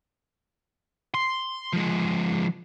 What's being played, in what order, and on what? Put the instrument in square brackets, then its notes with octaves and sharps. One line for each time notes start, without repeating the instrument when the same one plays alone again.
[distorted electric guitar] C6
F3 G#3